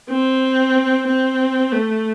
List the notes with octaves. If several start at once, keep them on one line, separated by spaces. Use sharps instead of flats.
C4
C4
A3